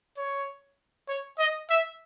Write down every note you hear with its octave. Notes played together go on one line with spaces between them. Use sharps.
C#5
C#5
D#5
E5